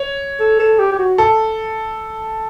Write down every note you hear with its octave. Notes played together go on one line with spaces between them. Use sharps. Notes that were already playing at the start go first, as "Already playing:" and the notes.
Already playing: C#5
A4
A4
G4
G4
F#4
A4